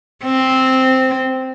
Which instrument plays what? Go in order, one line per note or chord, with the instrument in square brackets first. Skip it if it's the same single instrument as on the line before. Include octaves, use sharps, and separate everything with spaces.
[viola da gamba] C4